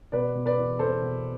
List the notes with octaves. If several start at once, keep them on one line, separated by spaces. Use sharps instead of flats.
B2 B4 D5
B2
B4 D5
E2
E2 A4 C5
B2